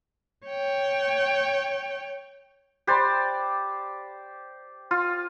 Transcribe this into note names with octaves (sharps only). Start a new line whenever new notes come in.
C#5 G5
G4 C5 D5 B5 C6 F#6
F4 C6 F6